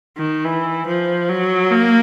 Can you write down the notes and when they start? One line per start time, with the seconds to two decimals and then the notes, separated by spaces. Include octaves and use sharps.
0.17 D#3
0.45 E3
0.87 F3
1.29 F#3
1.71 A#3